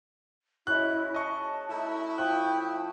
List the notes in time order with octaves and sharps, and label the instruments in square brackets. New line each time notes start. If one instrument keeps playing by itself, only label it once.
[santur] G#3 C#4 F#4 [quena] E4 [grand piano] F#6
[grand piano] D#5 C#6 [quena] A5
[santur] A3 D#4 [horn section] E4
[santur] F3 C#6 D#6 [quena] G5 [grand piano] F#6